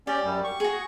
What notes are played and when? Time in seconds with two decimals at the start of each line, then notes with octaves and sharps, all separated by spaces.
0.07 C#4 G4 D5
0.24 F#2 G3
0.44 C#6
0.60 F#4 G#4